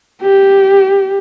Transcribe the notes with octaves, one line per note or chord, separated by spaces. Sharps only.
G4